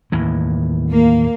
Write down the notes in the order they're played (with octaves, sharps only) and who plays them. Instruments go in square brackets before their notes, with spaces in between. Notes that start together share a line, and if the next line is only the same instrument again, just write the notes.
[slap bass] D#2 A2 E3
[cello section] A#3